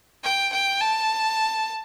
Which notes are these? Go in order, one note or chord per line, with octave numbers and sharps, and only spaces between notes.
G5
G5
A5